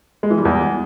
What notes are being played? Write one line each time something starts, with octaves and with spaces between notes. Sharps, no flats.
G#3
E3
G3
E2